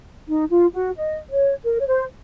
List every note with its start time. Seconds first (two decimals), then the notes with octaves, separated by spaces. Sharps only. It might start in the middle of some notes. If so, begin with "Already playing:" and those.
0.28 D#4
0.51 F4
0.74 F#4
0.96 D#5
1.30 C#5
1.64 A#4
1.80 C#5
1.87 C5